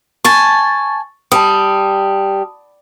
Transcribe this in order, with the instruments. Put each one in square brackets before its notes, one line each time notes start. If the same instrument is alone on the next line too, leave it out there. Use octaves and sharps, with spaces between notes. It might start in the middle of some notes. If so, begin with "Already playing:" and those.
[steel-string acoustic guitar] G#5 A5 [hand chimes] C#6 A6
[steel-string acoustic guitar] G3 [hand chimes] A5 D#6